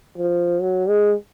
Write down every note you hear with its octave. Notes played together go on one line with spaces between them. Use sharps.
F3
F#3
G#3